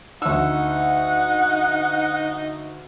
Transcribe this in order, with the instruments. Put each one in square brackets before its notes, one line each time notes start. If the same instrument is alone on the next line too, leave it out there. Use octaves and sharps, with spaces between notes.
[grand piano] D2 E6 [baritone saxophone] D#4 [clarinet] F#5